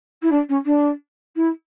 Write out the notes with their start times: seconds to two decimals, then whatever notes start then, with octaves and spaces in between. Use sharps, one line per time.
0.22 E4
0.31 D4
0.49 C#4
0.65 D4
1.36 E4